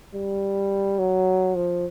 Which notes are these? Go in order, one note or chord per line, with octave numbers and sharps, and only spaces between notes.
G3
F#3
F3